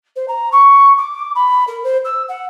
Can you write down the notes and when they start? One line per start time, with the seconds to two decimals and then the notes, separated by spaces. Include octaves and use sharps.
0.16 C5
0.28 A#5
0.52 C#6
0.97 D6
1.35 B5
1.67 A#4
1.84 C5
2.05 E6
2.28 F#5